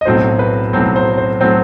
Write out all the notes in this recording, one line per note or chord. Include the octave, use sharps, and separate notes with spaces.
D#5
B1 A2 F#3 C4 C5
B4
B1 A2 F#3 C4 C5
C5
C5
A2 F#3 C4 C5